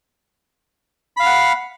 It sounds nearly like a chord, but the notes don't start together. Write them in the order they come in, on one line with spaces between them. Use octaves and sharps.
B5 F5 F6 F#5